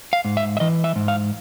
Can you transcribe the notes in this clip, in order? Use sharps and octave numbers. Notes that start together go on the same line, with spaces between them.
F5
G#2
E5
E5
E3 D#5
E5
G#2
F5